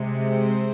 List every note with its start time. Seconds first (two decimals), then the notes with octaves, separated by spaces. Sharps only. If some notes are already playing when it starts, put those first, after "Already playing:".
Already playing: C3 G#3
0.26 C4